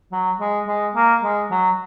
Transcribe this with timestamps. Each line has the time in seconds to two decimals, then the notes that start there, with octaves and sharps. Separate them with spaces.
0.12 F#3
0.40 G#3
0.68 G#3
0.95 A#3
1.23 G#3
1.51 F#3